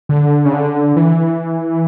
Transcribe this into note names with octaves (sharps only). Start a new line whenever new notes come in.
D3
C#3
D3
E3